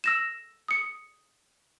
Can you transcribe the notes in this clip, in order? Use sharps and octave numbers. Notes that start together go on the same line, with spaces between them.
E6 A#6 E7
D#6 C#7